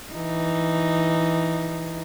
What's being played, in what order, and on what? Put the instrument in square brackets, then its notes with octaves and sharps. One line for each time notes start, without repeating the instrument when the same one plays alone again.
[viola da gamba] E3 D#4